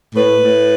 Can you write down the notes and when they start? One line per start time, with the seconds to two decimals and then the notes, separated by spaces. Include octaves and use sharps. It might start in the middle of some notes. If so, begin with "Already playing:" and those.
0.15 A2 B4
0.40 A2